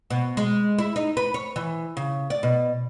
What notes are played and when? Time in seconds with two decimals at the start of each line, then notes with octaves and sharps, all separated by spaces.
0.10 B2
0.37 G#3
0.78 E4
0.96 D#4
1.17 B4
1.34 C#5
1.56 E3
1.97 C#3
2.30 D5
2.43 B2